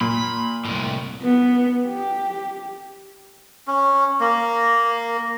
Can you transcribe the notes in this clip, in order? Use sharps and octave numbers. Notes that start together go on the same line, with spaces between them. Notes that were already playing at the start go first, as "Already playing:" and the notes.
A#2 B5
C2 A2
B3
G4
C#4
A#3